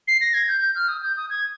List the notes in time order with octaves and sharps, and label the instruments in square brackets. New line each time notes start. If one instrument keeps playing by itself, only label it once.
[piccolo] C7
A#6
G#6
G6
G6
F6
D#6
G6
D#6
G#6